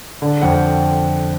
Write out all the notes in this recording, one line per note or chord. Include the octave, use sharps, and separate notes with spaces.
D3
F2 F#5
G5